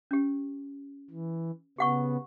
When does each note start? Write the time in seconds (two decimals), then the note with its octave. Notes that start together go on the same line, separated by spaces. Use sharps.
0.11 C#4 G4
1.10 E3
1.78 C#3 B3 G4 F#5 C#6